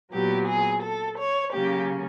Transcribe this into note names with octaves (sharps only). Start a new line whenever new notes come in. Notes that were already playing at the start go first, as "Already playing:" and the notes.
A#2 F#3 B3 G4
G#4
A4
C#5
C#3 F#3 A#3 C#4 G4